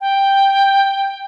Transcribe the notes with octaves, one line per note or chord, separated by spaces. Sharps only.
G5